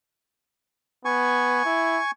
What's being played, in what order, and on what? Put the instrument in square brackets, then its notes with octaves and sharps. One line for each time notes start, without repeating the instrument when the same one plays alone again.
[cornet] B3 [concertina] G#5 C#6
[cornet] E4